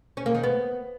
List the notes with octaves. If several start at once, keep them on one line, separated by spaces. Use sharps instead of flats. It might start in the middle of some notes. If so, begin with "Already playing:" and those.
C#4
A#3
D#3
B3